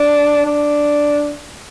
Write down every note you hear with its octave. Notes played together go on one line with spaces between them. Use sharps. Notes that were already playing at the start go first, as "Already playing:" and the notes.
Already playing: D4
D4